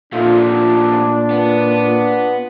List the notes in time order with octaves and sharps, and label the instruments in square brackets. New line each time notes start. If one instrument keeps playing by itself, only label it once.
[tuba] A#2 [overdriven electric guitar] F3 A3 [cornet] D4 [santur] D#4 F4
[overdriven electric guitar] B3